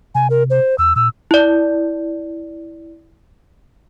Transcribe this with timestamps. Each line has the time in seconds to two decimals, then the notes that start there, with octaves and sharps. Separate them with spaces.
0.15 C3 G#5
0.30 A#4
0.50 C5
0.78 E2 E6
0.96 A#2 E6
1.31 E4 D5